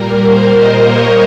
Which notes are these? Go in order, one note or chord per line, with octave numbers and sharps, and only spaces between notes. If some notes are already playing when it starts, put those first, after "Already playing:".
Already playing: A#2 G3 A#3 A#4
C5
D#5
C#5